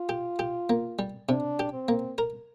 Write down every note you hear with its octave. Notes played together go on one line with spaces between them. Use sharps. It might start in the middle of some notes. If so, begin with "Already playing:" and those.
Already playing: F4
G4
G4
A#3
G3
C3 D4
G4
C4
A#3
A#4